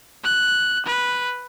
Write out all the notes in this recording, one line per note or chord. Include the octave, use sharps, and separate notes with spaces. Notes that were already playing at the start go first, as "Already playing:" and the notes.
F#6
B4